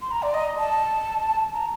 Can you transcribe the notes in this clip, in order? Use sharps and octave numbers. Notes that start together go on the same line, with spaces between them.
C6
A#5
D5
D#5
A5
A#5